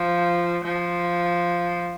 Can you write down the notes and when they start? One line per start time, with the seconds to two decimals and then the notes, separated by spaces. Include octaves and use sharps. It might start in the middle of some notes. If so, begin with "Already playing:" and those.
Already playing: F3
0.64 F3